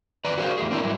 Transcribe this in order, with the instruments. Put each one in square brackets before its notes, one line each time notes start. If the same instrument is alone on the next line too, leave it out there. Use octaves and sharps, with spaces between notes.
[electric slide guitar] E2 B4 D5 A#5
F#4 G#4 A#4 C5 F5
E2 A3 G#4
A#3 C4 D4 E4 G4 A#4
G#2 F#3 G3 E4